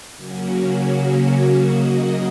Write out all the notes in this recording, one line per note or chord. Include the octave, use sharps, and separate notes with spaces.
C#3 F#3 A#3 C#4 F#4
C#3 F#3 A#3 F#4 D#5